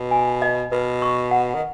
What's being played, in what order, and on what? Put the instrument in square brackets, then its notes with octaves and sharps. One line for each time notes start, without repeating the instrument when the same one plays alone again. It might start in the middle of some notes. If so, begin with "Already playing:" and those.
Already playing: [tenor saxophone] B2
[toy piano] G#5
D#5
[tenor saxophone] B2 [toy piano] B4
[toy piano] C#6
F#5
[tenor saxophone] D#3